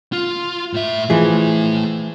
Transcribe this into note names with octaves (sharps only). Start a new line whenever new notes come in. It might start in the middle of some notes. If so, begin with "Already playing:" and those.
F4
A2 E5
E3 F3 A3 E4 G#4